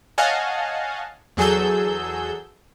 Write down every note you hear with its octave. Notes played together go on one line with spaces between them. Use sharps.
C#5 D#5 F5 F#5 G#5 A5
E2 F#3 G#4 A4 E6 G6